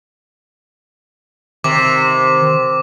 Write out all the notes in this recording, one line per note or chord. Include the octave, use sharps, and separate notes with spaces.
C3 D#3 D6